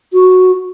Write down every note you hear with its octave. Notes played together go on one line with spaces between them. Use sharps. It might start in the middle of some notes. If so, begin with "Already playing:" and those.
F#4